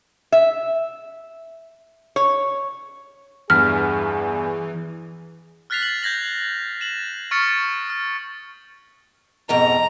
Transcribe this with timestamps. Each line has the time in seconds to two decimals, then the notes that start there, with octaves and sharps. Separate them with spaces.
0.32 E5
2.16 C#5
3.50 E2 G2 E3 G#4 F6 B6
5.70 F6 F#6 A6 B6 C7 F7
5.82 F#7
6.03 G6 G#6 A#6 F#7
6.80 A6 E7 F#7
7.31 C#6 D#6 F6 A6 B6 C#7
7.90 F6
9.49 F2 G#2 B2 A#5